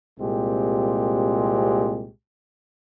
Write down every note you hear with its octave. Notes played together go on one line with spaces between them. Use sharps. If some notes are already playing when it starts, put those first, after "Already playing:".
C2 A#2 G#3 C4 G4